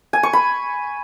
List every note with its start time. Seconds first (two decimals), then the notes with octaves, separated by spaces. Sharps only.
0.13 G#5
0.23 C#6
0.33 B5